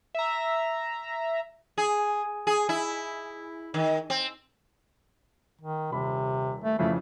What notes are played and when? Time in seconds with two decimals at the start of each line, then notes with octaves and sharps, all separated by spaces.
0.15 E5 A#5
1.78 G#4
2.47 G#4
2.69 E4
3.74 D#3
4.10 C4
5.61 D#3
5.92 D#1 C3 B5
6.64 A3
6.79 F2 C#3 E3 A3